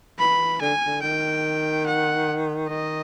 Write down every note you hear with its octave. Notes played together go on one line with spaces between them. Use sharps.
E3 B5
D3 G#5
D3
D#3 G5
F#5
D#3 D#5